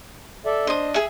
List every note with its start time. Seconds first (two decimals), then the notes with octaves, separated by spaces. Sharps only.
0.45 A4 D5 E5
0.67 D4 C5 D#5 D#6
0.94 G#4 E5